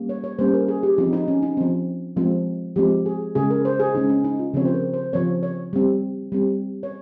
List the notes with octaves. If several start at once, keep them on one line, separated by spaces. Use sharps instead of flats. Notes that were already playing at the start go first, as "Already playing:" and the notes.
Already playing: G3 A#3 C#4
C#5
C#5
G3 A#3 C#4 C5
A#4
G#4
G4
F3 C4 D#4
D#4
C#4
D#4
F3 C4
F3 G#3 C4
F3 G#3 C4 G4
G#4
C#3 G#3 C#4 G#4
A#4
C5
G#4
C#3 G#3 C#4 D#4
C#4
D#4
F4
C#3 F3 C4 C#5
C5
A#4
C5
C#3 F3 C4 C#5
C#5
G3 C4
G3 C4
C#5